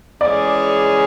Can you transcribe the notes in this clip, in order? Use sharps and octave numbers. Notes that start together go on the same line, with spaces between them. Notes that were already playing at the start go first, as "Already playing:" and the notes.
E3 G#3 C#4 G#4 D5